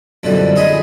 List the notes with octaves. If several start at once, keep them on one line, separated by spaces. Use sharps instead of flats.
F#2 B2 D3 E3 F3 G3
D#4 G#4 D#5 G#5 B5 C6